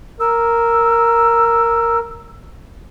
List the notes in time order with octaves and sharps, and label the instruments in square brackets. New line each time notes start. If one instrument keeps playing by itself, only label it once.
[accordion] A#4 [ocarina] E6